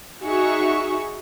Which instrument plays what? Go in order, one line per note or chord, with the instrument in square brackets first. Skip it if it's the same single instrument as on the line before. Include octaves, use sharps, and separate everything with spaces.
[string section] D#4 F#4 G#4 E5 C#6